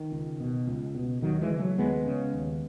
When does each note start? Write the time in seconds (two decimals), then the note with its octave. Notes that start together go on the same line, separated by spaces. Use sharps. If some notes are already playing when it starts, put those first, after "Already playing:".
Already playing: D#3
0.12 C#2
0.40 B2
0.67 C#2
0.95 B2
1.22 D#2 D#3 F#3
1.42 E3 G#3
1.51 C#3
1.59 F#3 A3
1.78 D#2 G#3 B3
2.06 C#3
2.33 D#2